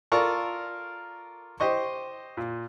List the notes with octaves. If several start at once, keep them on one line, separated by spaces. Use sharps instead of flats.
F4 A4 A#4 D5 C#6 F6
G4 C5 D#5 C#6
A#2